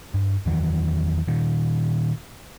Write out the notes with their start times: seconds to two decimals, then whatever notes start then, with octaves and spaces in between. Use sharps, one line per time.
0.14 G2
0.46 E2 D#3 E3 F#3
1.28 A#2 D#3